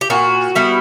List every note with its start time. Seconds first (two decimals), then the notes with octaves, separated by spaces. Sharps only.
0.01 G4
0.10 A#2 F#4
0.55 G3 B3 E4